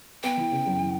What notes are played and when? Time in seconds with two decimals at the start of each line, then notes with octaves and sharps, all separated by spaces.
0.23 B3 G5
0.37 E3
0.52 C#3
0.66 F#2
0.80 E3